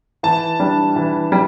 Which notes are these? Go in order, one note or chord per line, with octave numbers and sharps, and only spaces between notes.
E3 A5
G3 D4
E3
G3